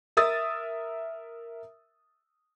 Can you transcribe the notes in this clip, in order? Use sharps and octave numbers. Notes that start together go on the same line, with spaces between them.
A#4 E5 D#6 E6 A6